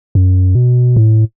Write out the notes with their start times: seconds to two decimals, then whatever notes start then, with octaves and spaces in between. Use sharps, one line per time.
0.15 F#2
0.55 B2
0.97 A2